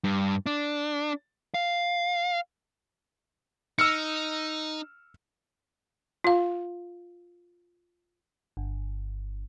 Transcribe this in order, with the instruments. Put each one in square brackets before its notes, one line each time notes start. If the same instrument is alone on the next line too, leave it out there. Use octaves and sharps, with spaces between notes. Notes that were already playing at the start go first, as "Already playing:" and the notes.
[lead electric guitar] G2
D4
F5
[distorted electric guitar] D#4 [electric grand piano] E6 F6 C#7
[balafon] F4 F5
[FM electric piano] G1